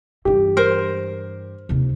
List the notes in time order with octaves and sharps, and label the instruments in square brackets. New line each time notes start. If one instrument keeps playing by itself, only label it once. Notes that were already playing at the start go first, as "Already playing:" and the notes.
[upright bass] G2 E3 [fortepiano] G4
[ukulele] A#4 C5
[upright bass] D#2 C3